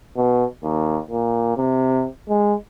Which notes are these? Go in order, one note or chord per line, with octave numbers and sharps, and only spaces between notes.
B2
D#2
A#2
C3
G#3